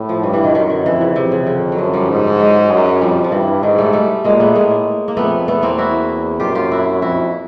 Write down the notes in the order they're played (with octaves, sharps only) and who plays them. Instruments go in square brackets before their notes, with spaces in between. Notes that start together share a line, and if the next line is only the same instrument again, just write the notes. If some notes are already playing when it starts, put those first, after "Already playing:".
Already playing: [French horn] A2
[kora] F3
[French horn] G2 [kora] E3
[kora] E3
D#3
[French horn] F#2 [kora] D#3
[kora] D3
[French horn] F2 [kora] E3
[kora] C#3
[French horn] F2 [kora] C3
[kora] C#3
D3
F#3
[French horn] F#2 [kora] F3
[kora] F3 G3
[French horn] G#2
[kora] F#3 G#3
[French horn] F#2
[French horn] F2 [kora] F3 G3
[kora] F3
[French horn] G2 [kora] E3
[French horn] G#2 [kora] D#3
[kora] G3 A3
G3 A3
[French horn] A#2 [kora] G#3 A#3
[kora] A3 B3
[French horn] A2 [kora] G#3 A#3
[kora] A#3
[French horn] F2 [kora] A3 B3
[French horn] E2 [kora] A3 B3
[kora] A#3 C4
E4 F#4
[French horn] F#2 [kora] F4 G4
[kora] F4 G4
E4 F#4
[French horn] F2 [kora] E4 F#4